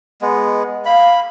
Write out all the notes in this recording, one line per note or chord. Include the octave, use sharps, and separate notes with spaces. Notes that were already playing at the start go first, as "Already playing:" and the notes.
G#3 B3
F5 B5